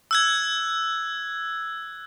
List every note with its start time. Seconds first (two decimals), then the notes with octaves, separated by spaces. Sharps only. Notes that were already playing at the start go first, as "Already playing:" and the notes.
0.11 E6 F#6 G#6